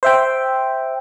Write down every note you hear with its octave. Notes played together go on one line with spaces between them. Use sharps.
C5 E5 G5